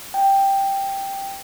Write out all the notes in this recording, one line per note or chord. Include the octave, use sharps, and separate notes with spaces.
G5